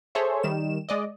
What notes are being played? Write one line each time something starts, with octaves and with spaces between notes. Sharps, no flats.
G#4 A4 C5 C#5 E5
D#3 G3 E7
G#3 D5 D#5